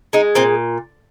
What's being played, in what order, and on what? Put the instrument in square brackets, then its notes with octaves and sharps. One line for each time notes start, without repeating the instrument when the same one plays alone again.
[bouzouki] G#3 D#4
A#2 C4